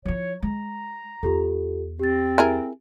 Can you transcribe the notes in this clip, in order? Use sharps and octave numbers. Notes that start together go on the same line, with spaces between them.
F3 E4 C#5
G#3 A#5
E2 F4 G4 A4
C4 G4 A6
E4 G#4 A#4